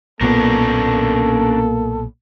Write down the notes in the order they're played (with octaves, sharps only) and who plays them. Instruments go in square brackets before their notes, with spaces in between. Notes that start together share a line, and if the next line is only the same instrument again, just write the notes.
[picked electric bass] B1 A#2 B3 [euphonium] A#3 [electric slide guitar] C#4 D4 A#4 [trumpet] A4